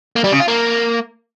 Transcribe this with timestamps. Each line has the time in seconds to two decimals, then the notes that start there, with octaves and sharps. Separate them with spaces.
0.16 A#3
0.24 G3
0.32 C#3
0.40 F4
0.48 A#3